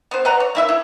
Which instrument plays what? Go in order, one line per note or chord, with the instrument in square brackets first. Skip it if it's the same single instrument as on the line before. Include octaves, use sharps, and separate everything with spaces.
[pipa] B3 C5
B4 D5 F#5 A#5
C#5
A#3 E4 E5
E4